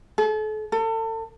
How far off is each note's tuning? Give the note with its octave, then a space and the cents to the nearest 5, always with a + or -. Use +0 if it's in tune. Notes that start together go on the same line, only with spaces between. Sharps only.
A4 -40
A4 +35